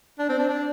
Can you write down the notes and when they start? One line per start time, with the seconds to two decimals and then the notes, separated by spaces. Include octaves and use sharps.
0.19 D4
0.29 C4
0.39 D4
0.49 D4